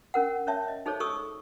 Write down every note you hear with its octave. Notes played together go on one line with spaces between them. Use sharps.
C#4 A#4 F#5
C#4 C#5 E5 A5
D#5
D#4 G#4 A4 C5 C#5
G#4 A4 C#6 D#6 E6